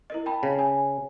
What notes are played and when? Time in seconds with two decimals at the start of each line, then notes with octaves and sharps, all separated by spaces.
0.10 E4 A#4 D#5
0.26 G5 A5 B5
0.43 C#3
0.59 G#5